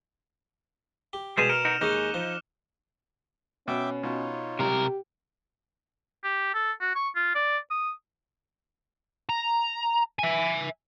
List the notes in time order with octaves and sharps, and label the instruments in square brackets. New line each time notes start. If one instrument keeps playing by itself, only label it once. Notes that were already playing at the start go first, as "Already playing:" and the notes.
[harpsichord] G4
[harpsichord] B2 [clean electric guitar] G3 G#3 G#4 [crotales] E7 F7
[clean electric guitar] A#4 [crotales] F6 C#7 D#7
[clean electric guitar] D#4 F#4 A#4
[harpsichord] D#2 G#3 C#4 [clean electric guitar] D#4 [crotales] D6 F#6 G7
[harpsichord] F3
[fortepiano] B2 [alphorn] C#4 [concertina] E5 G5 D6
[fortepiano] B2 [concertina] D#4 F4 C#5
[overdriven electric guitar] C3 A#4 [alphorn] G4
[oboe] G4
A4
F#4
C#6
F4
D5
D#6
[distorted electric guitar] A#5
E5 G#5